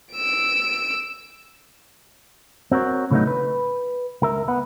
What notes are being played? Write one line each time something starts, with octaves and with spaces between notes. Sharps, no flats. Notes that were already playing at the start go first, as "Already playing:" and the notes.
E6 D7
C4 F#4 A#4 C#5
A2 C#3 F#3 A3 B3 D#4
B4
C#2 A#4 E5
B3 F#5